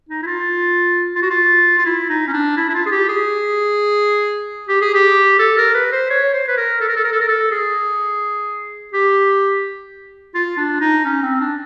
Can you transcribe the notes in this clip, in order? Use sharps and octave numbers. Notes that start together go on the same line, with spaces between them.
D#4
E4
F4
F4
F#4
F4
F4
E4
D#4
C#4
D4
E4
E4
F4
G#4
G4
G#4
G4
G#4
G4
A4
A#4
B4
C5
C#5
C5
B4
A#4
A4
A#4
A4
A#4
A4
A#4
A4
G#4
G4
F4
D4
D#4
C#4
C4
D4